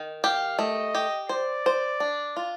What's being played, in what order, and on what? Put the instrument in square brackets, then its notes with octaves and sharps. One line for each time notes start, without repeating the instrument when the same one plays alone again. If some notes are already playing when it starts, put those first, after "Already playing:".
Already playing: [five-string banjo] D#3
[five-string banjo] G4 [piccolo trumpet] F5
[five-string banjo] A3 [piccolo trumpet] D#5
[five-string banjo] G4
[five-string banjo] C5 [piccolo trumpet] D5
[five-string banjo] C5
D4
F4